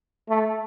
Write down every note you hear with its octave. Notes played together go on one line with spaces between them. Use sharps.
A3